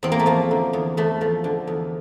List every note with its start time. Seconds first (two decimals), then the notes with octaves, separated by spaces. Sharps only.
0.03 E2 C4
0.12 A#3
0.19 A3
0.26 F3 A#3
0.51 D3
0.73 E2
0.97 E2 A3
1.21 F3
1.44 D3
1.67 E2